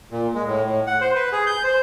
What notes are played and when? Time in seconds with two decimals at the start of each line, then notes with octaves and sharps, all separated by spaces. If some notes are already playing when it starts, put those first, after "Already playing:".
0.11 A#2
0.34 G#3
0.47 A2
0.65 A2
0.87 F#5
1.01 C5
1.15 B4
1.32 G#4
1.47 G6
1.64 C5